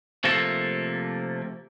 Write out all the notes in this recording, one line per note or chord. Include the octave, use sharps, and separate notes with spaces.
C3 F3 A3 A#3 A4